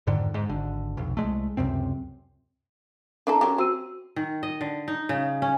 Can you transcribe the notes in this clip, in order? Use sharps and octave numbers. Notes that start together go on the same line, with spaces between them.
F2 G#2 D3 D#3
G#2
G#1 D3
F1 B1
C2 G#3 A3
C#2 F#2 C3 C4
D4 E4 A4 A#4 A#5
F#3 C#4 G4
C4 F#4 E6 D#7
D#3
D#5
D3
D#4
C#3
C#4